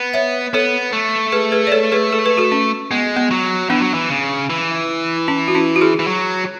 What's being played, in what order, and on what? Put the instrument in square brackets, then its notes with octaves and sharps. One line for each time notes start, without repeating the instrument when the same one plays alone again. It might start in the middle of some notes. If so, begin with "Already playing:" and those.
Already playing: [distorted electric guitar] B3
[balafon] C#5 E5
[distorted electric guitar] B3 [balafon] A4 C#5
[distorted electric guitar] A3
[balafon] G#4 B4
G#4 B4
D5
A4 C#5
G#4 B4
A4
B4
F#4 A4
C#4
[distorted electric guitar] G#3 [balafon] B3
[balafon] B3
[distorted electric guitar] F#3
[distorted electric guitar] E3 [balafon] B3 D4
[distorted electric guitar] F#3
E3
C#3
E3
[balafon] C#4 E4
F#4
C#4 E4
F#4
E4 G#4
[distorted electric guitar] E3
F#3